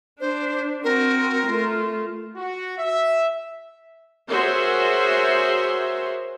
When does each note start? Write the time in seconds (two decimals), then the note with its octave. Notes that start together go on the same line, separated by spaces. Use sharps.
0.20 D4 C5
0.84 C4 F#4 A#4
1.45 A3 F4
2.36 F#4
2.78 E5
4.30 F#4 G#4 A#4 C5 C#5 E5